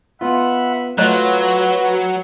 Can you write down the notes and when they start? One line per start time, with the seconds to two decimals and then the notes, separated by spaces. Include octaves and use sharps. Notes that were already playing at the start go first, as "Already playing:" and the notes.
0.21 B3 F4 E5 F#5 B5
0.98 F#3 A3 F4 F#4 B4 C#5 D#5 F#6